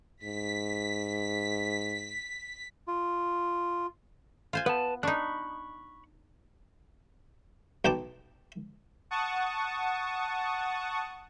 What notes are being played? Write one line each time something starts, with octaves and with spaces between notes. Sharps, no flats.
G#2 B6
F4
F4 C5 G#5
B3 B4 A5
D4 D#4 B5 C#6 F#6
B1 G5 A5 D6
F#5 A5 C#6 D#6